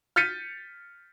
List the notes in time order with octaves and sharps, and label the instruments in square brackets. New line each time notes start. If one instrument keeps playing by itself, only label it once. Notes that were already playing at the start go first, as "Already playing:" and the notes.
[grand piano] F6 G6 A6 B6 C#7 D#7